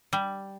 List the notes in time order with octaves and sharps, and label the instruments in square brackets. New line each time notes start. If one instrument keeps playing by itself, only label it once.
[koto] G3